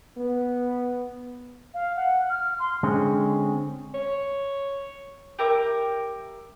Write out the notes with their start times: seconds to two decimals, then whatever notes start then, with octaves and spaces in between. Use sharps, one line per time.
0.17 B3
1.74 F5
1.96 F#5
2.29 F6
2.59 C6
2.83 D3 G#3 C4 C#4
3.94 C#5
5.39 G4 A#4 E5 D6